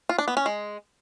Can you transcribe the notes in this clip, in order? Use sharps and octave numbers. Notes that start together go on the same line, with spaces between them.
F4
D4
B3
C#4
G#3